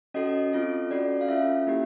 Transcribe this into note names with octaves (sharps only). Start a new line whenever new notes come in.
C#4 F#4 A4 D#5
C4 F4 A4
C#4 F#4 A4 D5
F5
C#4 F4 A4 E5
A#3 C#4 E4 G4